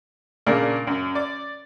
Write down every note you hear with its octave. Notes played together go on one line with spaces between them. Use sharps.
A#2 C#3 A#3 D4 A#4
F#2
D5